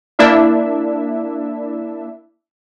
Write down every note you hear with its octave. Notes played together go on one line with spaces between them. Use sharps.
A#3 D4 E4 E5